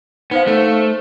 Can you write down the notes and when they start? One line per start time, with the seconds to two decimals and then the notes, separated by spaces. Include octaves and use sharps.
0.31 B3 D#4 C5 F5
0.47 A3
0.74 C5